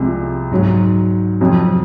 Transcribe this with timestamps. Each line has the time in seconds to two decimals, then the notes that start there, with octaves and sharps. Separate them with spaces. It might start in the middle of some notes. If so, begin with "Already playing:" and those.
Already playing: C2 C3 F3 G#3
0.51 G#2 F#3
1.40 F2 C3 F#3